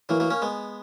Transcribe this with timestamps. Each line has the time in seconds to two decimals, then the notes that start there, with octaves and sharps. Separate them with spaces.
0.09 E3 F#3 A#3
0.20 F#3 A#3
0.30 A#3 C#4
0.42 G#3 B3